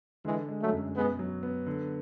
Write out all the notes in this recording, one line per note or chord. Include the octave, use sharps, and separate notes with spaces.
D3 E3 G#3
G#3
F#3 A3
F#2
B2 G#3 B3
F#3
B3
D3